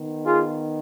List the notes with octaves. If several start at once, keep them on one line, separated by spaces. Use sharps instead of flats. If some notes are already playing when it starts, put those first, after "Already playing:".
Already playing: D#3 B3
F4 G#4